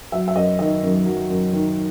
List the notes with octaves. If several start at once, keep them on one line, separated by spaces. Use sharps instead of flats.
F#3 E5
E5
F#2 D#5
D#3 D#5
F#2
F#3
F#2
D#3